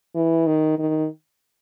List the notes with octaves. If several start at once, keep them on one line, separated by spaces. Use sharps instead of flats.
E3
D#3
D#3